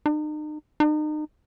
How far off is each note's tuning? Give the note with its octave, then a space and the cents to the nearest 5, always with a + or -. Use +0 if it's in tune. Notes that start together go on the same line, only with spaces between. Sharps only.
D#4 -40
D#4 -35